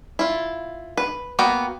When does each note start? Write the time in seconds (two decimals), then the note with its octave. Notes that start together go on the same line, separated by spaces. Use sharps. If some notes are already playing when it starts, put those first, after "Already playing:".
0.19 E4 F4
0.97 B4
1.39 A#3 B3 F#4 B4 G5